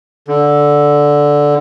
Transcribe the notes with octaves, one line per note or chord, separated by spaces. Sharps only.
D3